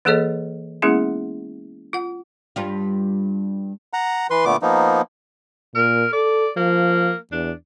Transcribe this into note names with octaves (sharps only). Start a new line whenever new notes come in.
E3 A#3 G#4 A4 C#5 D#5
G#3 A#3 B3 C#4 E4 G#4
F4 F#5
G2 G3 F4
F#5 A#5
E3 B4 C6
A#2 D3 A3 B3 D6
F3 A#3 B3 D#4
A#2 A#4
A4 D5
F3 A#3
E2 D4